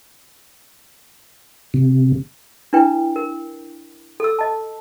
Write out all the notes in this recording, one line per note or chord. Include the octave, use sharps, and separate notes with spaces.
C3
D4 E4 B4 G5
A#4
A4 E6
D#5 A5